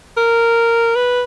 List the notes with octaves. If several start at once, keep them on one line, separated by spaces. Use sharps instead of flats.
A#4
B4